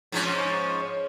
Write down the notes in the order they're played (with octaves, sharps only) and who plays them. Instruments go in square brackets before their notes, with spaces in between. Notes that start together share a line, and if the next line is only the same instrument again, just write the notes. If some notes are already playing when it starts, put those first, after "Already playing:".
[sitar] G#2 F3 C#4